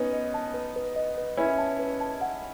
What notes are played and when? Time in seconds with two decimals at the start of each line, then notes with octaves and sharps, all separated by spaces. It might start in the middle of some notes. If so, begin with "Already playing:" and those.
Already playing: B3 C#4 D#4 B4
0.13 D#5
0.34 A5
0.54 B4
0.76 B4
0.96 D#5
1.17 B4
1.37 C#4 E4 B4
1.58 A5
1.79 B4
2.01 A5
2.21 F#5